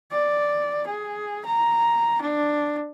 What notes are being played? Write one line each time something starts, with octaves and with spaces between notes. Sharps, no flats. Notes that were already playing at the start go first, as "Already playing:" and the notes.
D5
G#4
A#5
D4